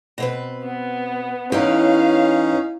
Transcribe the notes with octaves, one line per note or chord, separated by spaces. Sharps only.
B2 C4 B4
B3
E2 C#4 D#4 G4 B4 C#5 F5